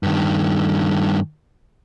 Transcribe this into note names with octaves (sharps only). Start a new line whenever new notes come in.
G2 D#3